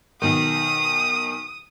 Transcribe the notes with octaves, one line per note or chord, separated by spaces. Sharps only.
B1 D#3 D#6